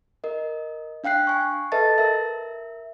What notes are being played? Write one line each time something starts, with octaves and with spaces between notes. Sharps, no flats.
A#4 D#5
D4 F5 G5 F#6 C7
G#5 C#6
A4 B4 D#5 E5 A5 A6
A#4 E5